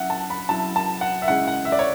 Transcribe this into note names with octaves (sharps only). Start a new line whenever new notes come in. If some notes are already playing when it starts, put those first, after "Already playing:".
Already playing: F#3 C#4 E4 E5 F#5
A5
B5
F#3 C#4 E4 A5
A5
F#5
E5
C#3 G#3 C#4 E4 F#5
F#5
E5
D5
C#5